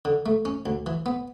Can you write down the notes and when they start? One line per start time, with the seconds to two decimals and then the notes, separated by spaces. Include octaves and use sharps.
0.05 D3
0.26 A3
0.45 C#4
0.66 D2
0.86 E3
1.06 B3